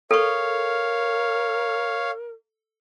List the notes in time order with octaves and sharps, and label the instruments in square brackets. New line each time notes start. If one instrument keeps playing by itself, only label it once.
[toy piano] A4 C#6 [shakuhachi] A#4 [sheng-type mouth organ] C#5 F5